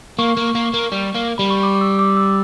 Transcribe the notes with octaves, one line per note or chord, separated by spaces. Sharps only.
A#3 C#6
A#3
A#3
A#3
G3
A#3
G3 B5
C#6
D6
D6
E6
D6
E6